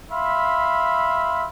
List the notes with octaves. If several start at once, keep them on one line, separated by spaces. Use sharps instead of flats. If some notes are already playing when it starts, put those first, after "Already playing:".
E5 F5 B5 C6